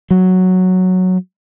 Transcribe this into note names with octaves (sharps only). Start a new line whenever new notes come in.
F#3